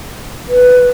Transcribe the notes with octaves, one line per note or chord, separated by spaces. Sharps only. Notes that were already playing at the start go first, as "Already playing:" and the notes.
B4